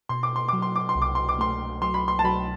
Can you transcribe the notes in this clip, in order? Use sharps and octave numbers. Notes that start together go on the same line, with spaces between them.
B2 C6
D6
C6
F#3 D6
C6
D6
C6
C2
D6
C6
D6
A3 C6
F#3 C6
B5
C6
A5
F#3 B5